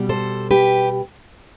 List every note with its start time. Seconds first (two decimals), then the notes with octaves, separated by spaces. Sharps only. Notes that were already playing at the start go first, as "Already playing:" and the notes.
Already playing: B2 G3
0.09 A4 C5
0.51 G4 B4